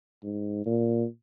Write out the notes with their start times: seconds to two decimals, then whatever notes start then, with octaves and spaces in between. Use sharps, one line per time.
0.23 G#2
0.66 A#2